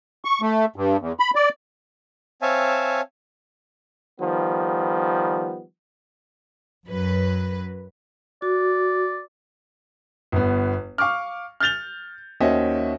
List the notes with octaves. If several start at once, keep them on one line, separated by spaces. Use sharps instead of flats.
C#6
A3
G2
E2
B5
D5
C4 C#5 E5 F5 G#5 A5
D#3 F3 G3 B3
F#2 F#3 B4
F#4 D5
G1 B3
F5 C#6 D6 F6
F6 G6 A6 F7 G7
D#2 C#4 F#4 C5 D#5 E5